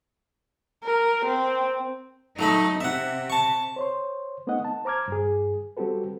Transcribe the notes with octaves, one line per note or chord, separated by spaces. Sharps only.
A#4
C4
F#3 A3 D#4 B5
C3 E5 F#5
A5 C#6
C5 C#5 C6
A3 B3 C4 D#4 D#5 F#5
A5
C5 A#5 D6 F6 G#6
G2 G#4
G3 C4 F#4 G4 A4 B4